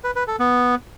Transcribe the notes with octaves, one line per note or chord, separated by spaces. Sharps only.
B4
B4
A4
B3